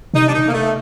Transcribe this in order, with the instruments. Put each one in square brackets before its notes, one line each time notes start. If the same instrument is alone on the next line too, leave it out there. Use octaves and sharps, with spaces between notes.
[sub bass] C3 [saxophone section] D#4
[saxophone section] D4
D#4
A#3
A3